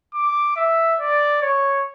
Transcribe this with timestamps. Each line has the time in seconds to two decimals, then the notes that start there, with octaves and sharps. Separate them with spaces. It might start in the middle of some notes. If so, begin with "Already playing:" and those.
0.14 D6
0.56 E5
1.00 D5
1.42 C#5